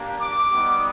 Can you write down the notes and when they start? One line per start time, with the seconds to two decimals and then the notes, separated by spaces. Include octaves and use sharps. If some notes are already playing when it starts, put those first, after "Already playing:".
Already playing: A#3 D4 G4
0.21 D6
0.51 G3 B3 D#4